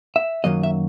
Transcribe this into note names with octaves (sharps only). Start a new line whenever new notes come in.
E5
F#2 D#3 F#3 A#3 D#5
E5